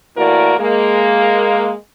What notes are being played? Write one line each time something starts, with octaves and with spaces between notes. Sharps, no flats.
A2 E3 A#3 F#4 A#4 D5
G#3 A#3